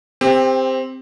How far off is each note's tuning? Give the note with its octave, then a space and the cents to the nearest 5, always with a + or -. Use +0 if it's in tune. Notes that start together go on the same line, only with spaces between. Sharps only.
C4 +0 G4 +25